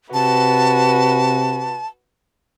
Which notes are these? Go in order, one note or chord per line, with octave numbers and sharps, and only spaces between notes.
C3 F#4 B4 A5